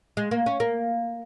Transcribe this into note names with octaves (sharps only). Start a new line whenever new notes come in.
G#3
A#3
C#4
A#3